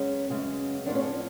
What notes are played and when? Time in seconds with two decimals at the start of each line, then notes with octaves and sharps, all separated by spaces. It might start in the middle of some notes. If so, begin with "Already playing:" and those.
Already playing: F#2 C#3 G#3 B3 C#4
0.29 F#2 C#3 G#3 B3
0.86 A2 F3 B3 D4
0.95 C#4
1.03 D4